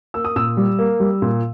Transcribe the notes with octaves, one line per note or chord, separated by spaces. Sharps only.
A#3 E6
D#6
A#2 E6
G3
A#3
G3
A#2